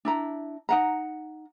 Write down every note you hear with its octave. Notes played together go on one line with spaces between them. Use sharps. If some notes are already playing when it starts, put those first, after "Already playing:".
D4 E4 A#5
D#4 F#5 A#5